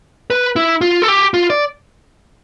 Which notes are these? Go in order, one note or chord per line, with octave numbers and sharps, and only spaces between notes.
B4
E4
F4
A4
G4
F4
D5